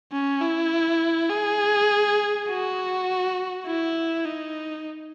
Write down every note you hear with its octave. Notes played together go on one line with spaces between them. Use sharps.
C#4
E4
G#4
F#4
E4
D#4